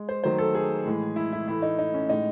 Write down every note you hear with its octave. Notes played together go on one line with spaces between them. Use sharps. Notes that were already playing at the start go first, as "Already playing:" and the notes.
Already playing: G#3
C5
D#3 F#3 A3 C5
A4
G#4
A2 E3 G#3
E4
E4
A2 E3 A3 E4
D#4
D#4
C#4
A2 G#3 D#4